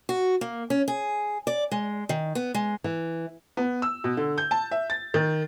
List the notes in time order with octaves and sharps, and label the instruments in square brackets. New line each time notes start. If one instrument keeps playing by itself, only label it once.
[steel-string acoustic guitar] F#4
A#3
C#4
G#4
D5
G#3
D#3
B3
G#3
[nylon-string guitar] E3
[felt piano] B3
E6
B2
D3
G6
A5
E5
A6
D#3